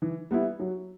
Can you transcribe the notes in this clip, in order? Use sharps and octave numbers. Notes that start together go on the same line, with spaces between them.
E3
G3 B3 E4
F#3